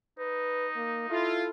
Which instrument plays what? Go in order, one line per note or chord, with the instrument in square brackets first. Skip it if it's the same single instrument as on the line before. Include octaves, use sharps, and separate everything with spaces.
[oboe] D#4 [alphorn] B4
[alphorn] A#3
[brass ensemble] E4 F4 [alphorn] A4